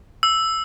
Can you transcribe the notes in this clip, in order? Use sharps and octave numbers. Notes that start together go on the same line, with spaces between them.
E6